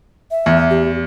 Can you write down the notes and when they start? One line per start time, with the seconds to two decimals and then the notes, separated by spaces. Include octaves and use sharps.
0.31 E5
0.46 E2
0.70 G4